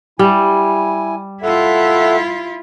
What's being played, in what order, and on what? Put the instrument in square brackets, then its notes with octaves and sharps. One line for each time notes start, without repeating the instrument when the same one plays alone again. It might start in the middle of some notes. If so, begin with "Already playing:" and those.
[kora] G3 [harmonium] E4 G#5
[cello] E4 F4 [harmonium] A4 E5 F#5